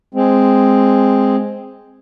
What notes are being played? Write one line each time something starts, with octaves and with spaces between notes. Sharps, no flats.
G#3 C4